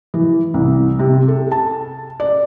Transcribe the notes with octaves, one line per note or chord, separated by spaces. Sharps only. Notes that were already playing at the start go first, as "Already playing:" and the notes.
E3
C2
C3
A4
A5
D5